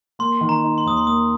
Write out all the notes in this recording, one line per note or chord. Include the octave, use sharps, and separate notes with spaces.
A#3 C6
D#3
A#5
D#4
C6
D#2 D#6
C6
A#3 D#6